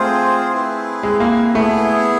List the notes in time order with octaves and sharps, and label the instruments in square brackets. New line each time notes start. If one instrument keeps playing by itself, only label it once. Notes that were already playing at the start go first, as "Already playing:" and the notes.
Already playing: [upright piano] A3 [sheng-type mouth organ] C4 F4 G#4 C5
[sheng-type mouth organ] C4 E4 G#4 B4
[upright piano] G#3
A#3
[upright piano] A3 [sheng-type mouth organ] B3 E4 G#4